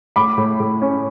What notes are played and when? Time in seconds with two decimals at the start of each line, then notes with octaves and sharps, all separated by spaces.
0.16 A2 B5 D6
0.38 A2
0.60 A2
0.82 C#4